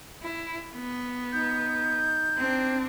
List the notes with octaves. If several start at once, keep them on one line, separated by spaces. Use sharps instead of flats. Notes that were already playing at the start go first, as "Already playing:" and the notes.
E4
B3
D#4 G6
C4 D4